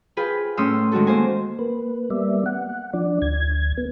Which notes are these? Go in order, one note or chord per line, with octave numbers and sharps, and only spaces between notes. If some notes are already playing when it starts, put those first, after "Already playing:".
F4 G#4 B4 G5
A2 C#4 G5 C6 D#6 E6
D#3 G#3 F#4 A4
A#3 C5 G#5
A#3 B4
G3 A#3 B3 D5 E5
F#5
F3 D4 D5
D2 G#6
B3